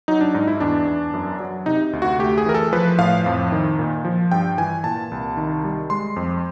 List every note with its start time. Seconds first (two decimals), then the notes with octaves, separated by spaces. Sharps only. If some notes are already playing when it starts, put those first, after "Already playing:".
0.08 F#3 D#4
0.21 D4
0.34 G#2 D#4
0.48 E4
0.60 E2 D4
0.87 E2
1.13 F#2
1.40 F#3
1.66 C3 D#4
1.93 D2
2.02 F#4
2.19 A3 G4
2.38 G#4
2.46 E3 A#4
2.54 A4
2.73 F3 B4
2.99 A2 F5
3.26 F2
3.52 D#3
3.79 A#2
4.05 F3
4.32 G2 G5
4.58 E3 G#5
4.84 A#2 A5
5.12 C2
5.37 D#3
5.64 G3
5.90 G#3 C6
6.16 F2